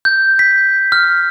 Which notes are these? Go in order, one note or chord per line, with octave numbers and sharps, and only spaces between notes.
G6
B6
F6